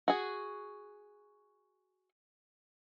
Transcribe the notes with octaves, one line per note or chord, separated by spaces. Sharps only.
F#4 G#4